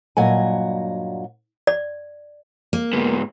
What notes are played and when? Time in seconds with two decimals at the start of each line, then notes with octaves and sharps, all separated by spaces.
0.17 G2 A#2 F#3 D#5 G#5
1.67 D5
2.73 A#3
2.93 G#2 B3